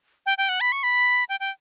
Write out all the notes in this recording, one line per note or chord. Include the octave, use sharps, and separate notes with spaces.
G5
G5
F#5
B5
C#6
B5
G5
G5